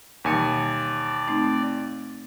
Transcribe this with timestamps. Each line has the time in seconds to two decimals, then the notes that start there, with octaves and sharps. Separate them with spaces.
0.25 D#2 B2 E3 G3 D5 G#5 C#7
1.28 A3 C4 D#4